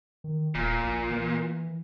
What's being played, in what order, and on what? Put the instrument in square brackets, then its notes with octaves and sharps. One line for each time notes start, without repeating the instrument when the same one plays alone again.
[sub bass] D#3
[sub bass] D#1 [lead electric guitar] A#2
[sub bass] A#1
E3